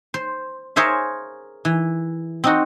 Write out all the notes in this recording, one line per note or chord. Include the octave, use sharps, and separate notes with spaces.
C5
G#4 A#4 C5 C#5 E5 F5
E3
C4 D#4 F#4